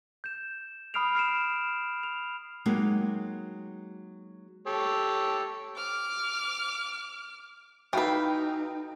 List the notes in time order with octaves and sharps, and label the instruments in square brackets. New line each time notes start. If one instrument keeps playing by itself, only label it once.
[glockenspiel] G6 E7
B5 D#6 F6 C7 D7 F7
F6 C7 D7 E7
F7
[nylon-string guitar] F#3 G#3 A#3 D#4 G4
[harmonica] G4 A4 C#5
[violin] D6 F6
[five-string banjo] E3 B4 [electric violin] D#4 [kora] F#4 A4 F5 [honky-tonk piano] G5